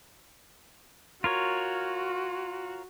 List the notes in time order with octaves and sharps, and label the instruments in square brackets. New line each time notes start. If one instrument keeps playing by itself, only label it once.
[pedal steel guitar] F4 A#4 C#5 [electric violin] F#4